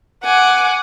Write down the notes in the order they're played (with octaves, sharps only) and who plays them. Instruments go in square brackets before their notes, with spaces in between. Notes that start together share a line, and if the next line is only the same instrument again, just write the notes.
[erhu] F#5 [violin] G#5 D6